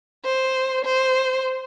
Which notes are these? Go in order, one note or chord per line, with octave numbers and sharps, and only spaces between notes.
C5
C5